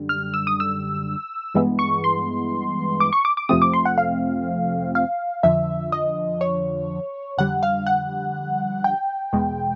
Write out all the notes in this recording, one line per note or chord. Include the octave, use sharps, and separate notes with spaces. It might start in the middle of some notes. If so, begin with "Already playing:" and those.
Already playing: F#2 D3 G3
F6
E6
D#6
E6
G2 E3 G#3 B3
C#6
C6
D6
C#6
D6
D6
F2 C3 F3 A3 C4 D#6
D6
C6
F#5
F5
F5
F2 D3 F3 E5
D#5
C#5
F2 D3 G3 F#5
F5
F#5
G5
E2 B2 G#3